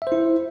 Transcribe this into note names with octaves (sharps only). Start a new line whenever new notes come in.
E4 C5 E5